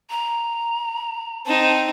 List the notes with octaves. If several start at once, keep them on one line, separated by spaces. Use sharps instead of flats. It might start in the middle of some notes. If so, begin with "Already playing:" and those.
A#5
C4 D#4 A5